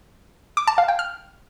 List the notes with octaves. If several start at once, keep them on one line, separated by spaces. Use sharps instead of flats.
D6
A5
F5
G5
F6